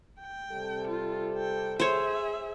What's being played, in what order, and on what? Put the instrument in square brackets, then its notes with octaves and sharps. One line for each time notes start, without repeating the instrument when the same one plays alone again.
[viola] G5
[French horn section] C3 G3 A4
[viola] F4
G5
[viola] G#4 E5 [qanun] C5 C#5